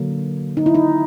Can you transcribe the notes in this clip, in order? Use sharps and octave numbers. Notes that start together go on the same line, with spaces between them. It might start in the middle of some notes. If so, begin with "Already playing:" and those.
Already playing: D3 F#3 A#3
D#4
E4
D#4